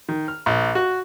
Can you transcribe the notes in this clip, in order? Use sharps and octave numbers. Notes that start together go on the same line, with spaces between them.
D#3
F6
A#1
F#4